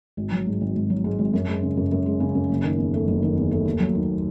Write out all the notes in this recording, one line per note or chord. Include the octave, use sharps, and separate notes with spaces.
G#1
F#3
G#2
G#1
G#1
F#3
G#2
G#1
F#2
G#3
C#3
F#2
F#2
G#3
C#3
F#2
F#1
D#3
E2
A3
F#1
D#3
E2
A3
D#2
F#3
D#3